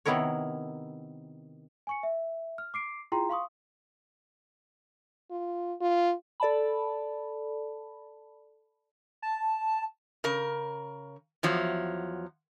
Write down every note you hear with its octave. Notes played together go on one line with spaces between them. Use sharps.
C3 D#3 B3 E4 A#4 C#5
G#5 C#6 C#7
E5
F6
D6 C7 D7
E4 F4 G#4 G5 A#5 C6
F5 C6 C#6 D#6
F4
F4
A4 D5 A5 B5
A5
C#3 A#4
E2 F3 F#3